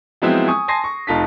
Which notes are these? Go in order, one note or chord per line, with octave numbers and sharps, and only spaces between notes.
F3 F#3 G#3 B3 C4 E4
G#5 C#6 D#6
G#5 A5 C6 A#6 C7
C#6
F1 D#4 F4 A5 B6